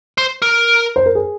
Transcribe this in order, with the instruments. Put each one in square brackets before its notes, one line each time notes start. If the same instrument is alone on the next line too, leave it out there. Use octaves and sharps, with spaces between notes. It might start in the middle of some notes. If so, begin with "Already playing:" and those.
[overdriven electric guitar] C5
A#4
[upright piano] C5
A#4
G#4